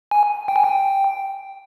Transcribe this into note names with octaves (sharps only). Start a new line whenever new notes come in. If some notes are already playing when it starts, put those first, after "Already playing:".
G#5
G5
G#5
G5